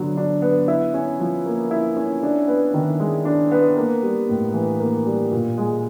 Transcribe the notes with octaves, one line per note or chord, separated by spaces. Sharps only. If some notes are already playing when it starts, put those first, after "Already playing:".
Already playing: D3 F#3 B3
D4
B3
E4
C#4
F3
A#3
E4
C#4
D4
B3
D#3
G#3
D4
B3
A#3
G3
A2
E3
A#3
G3
A#2
G#3